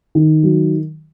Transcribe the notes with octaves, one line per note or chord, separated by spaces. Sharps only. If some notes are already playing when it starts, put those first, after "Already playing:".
D#3
F#3